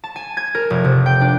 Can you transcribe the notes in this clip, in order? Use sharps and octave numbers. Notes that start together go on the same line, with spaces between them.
A5
G#5
G#6
A#4
F1
C3
G5
D4